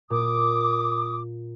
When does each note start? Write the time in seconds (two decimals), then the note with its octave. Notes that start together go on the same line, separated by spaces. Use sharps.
0.10 A#2 D6 D#6